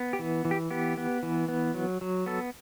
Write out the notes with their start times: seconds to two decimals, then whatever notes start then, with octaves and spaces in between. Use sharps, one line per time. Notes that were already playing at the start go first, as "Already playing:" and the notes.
Already playing: B3
0.13 G4
0.19 E3
0.45 E3
0.51 G4
0.71 B3 G4
0.98 B3
1.23 E3
1.48 B3
1.74 F#3
2.01 F#3
2.26 B3 A4